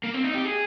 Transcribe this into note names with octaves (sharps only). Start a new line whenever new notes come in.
A#3
C4
D#4
G4
G#4